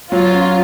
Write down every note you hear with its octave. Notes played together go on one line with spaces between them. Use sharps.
F#3 F4
C#4